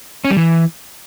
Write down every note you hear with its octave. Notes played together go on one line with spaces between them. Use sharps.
C#4
G3
E3